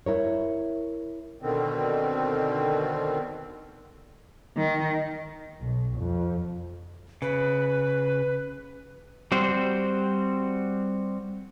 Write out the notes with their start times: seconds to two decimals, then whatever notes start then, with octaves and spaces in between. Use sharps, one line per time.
0.06 E4 A#4 C#5
1.42 B2 D3 D#3 C4
4.57 D#3
5.60 B1
5.97 F2
7.22 C#3 B4
9.32 G3 C4 F#4 C5